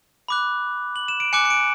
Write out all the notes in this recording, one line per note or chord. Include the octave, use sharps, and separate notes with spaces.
B5 D6 F#6
F#7
E7
D7
G#5 D6 F#6 C#7
C#7
D7